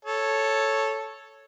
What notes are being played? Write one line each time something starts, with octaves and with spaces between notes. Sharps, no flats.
A4 C#5